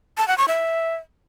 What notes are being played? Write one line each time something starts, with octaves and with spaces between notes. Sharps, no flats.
A5
F#5
C#6
E5